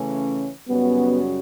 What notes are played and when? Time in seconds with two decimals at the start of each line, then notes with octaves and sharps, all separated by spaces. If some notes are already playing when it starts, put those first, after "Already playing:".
Already playing: C#3 E3 A3 C#4
0.69 F#2 C#3 G3 B3 C#4 F#4